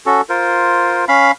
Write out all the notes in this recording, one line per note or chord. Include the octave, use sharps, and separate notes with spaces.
C#4 F#4 A4
F4 A#4 C5
C#4 F5 B5